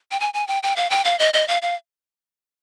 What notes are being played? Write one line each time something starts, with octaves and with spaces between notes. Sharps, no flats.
G5
G#5
G#5
G5
G5
F5
G5
F5
D#5
D#5
F5
F5